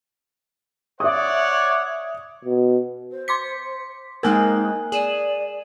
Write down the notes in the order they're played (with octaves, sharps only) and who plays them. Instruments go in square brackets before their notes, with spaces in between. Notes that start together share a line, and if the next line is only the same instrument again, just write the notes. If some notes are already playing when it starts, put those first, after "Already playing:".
[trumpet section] C#5 D5 F#5 [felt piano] E5 D#6
[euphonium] B2
[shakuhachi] C5
[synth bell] C6 D6 B6 [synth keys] C#7
[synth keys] G#3 A#3 C4 [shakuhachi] D#4 [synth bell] A#4 G#5 F#6
[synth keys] G#4 [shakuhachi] D5 [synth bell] D#7 E7 F#7